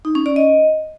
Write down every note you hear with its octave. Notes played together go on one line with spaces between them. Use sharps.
D#4
C#4
D5
D#5